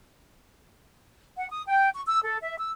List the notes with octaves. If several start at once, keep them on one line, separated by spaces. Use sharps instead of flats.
F#5
D#6
G5
C#6
E6
A4
E5
E6